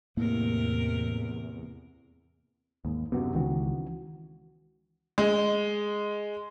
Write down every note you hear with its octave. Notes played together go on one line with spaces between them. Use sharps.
E2 A2 C3 A#3 A#4
D#2 G#2
F#2 C3 B3 F#4
C#2 D#3 E3 F#4
G#3